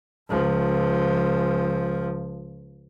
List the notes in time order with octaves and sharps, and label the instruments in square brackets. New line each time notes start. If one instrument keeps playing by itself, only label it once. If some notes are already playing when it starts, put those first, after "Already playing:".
[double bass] C#2 F3